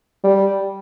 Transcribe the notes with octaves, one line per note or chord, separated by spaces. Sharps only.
G3